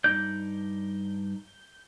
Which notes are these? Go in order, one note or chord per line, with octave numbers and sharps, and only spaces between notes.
G2 D#4 D5 G6